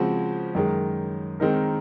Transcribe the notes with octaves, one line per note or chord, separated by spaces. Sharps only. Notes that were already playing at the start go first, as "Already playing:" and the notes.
Already playing: C#3 F3 G#3 C4 F#4
F#2 D#3 G#3
D#3 G#3 C4 D#4 A#4